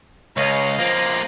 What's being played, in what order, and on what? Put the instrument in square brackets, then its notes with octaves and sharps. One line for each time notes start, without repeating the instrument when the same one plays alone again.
[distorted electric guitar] C#2 [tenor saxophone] C#5 [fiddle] D#5 F5
[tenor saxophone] F3 [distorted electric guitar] A#3 C4